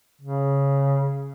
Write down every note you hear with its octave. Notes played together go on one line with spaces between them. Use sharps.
C#3